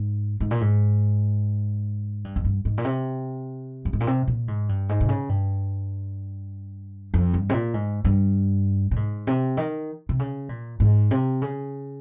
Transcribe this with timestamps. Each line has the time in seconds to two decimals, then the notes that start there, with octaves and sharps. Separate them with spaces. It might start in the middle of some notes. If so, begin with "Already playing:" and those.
Already playing: G#2
0.40 G#2
0.51 A#2
0.61 G#2
2.24 G2
2.36 F2
2.45 G2
2.65 G#2
2.78 A#2
2.84 C3
3.85 G2
3.93 G#2
4.00 A#2
4.07 C3
4.27 A#2
4.48 G#2
4.69 G2
4.89 G#2
5.00 C3
5.09 C#3
5.29 G2
7.14 F2
7.34 G2
7.49 C3
7.53 A#2
7.74 G#2
8.05 G2
8.91 A#2
8.96 G#2
9.27 C3
9.57 D#3
10.09 C3
10.19 C#3
10.49 A#2
10.80 G#2
11.11 C3
11.42 C#3